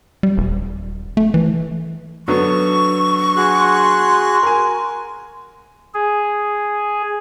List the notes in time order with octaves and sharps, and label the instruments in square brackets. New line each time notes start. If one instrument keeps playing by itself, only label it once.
[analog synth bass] G3
D#1
A3
E3
[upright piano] D3 F#3 B3 [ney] C#6
[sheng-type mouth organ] F#4 G#4 F#6 [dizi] C6
[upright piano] A#4 G#5
[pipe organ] G#4